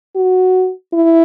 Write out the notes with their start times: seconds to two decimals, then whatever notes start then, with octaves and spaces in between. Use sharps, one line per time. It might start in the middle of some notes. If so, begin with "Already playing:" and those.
0.16 F#4
0.94 E4